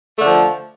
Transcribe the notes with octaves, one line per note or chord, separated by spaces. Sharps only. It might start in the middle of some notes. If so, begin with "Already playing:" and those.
D3 F3 A3